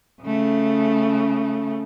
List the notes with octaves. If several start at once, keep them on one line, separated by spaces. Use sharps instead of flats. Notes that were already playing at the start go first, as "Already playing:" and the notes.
C#3 A3